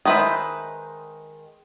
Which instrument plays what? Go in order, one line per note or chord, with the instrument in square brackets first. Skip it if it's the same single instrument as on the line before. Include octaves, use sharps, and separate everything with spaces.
[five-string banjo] D#3 G#3 B4 C5 E5